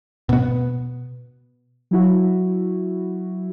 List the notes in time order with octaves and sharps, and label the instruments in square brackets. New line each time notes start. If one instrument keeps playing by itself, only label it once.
[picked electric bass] B2 B3
[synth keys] F#3 E4 F#4